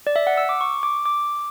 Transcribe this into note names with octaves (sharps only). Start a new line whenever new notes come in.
D5
E5
F#5
E6
D6
C#6
D6
D6